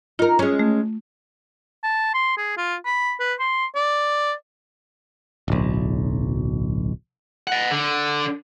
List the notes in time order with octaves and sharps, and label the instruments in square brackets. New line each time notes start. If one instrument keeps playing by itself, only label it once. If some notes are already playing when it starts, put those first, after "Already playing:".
[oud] D#4 A#4 [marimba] F4
[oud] G#3 C#4
[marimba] A3
[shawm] A5
C6
G#4
F4
B5
B4
C6
D5
[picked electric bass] D1 B1
[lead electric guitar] D#5 F#5
D3